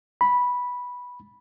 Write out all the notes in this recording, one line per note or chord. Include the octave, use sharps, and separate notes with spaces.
B5